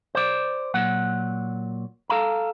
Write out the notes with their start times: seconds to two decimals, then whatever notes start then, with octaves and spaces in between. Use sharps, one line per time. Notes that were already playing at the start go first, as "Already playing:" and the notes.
0.15 C5 D5
0.74 A#2 F#3 F#5
2.10 A4 F5 A#5